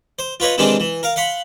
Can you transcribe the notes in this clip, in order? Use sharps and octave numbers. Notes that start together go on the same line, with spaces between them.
C5
F4 B4 C#5 D#5
C3 D#3 E3 G#3 C4 D4
E3
A#4 F5
F5 F#5 B5 C6